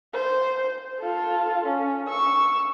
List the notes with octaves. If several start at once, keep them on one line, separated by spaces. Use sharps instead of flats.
C5
F4 A4
C#4
C#6 E6